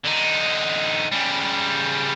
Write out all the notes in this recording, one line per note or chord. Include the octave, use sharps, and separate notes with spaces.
D3 D#4
C#3 G3